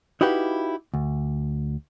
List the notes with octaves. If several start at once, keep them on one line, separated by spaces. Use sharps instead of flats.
D#4 E4 F#4 G4 B4 F5
D2